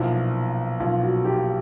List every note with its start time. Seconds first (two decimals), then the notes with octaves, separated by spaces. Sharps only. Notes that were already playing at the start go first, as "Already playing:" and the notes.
Already playing: B1 A#2 F3 E4
0.80 B1 A#2 F3 F4
1.03 F#4
1.25 G4